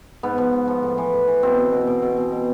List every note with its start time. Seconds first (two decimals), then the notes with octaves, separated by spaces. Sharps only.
0.23 G#2 B3
0.38 F3
0.53 G#2
0.68 F3
0.83 A2
0.98 E3
1.13 A2
1.28 E3
1.43 B2 C4
1.57 B2
1.73 B2
1.87 B2
2.02 B2
2.17 B2
2.32 B2